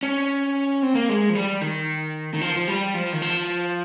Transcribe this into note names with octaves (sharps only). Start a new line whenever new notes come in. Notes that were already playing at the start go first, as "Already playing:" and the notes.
C#4
C4
A#3
G#3
F3
G3
D#3
D#3
F3
F3
G3
F3
D#3
F3